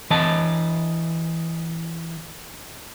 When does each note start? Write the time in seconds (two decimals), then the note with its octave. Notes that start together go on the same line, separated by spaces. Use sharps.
0.11 E3 D#5 A5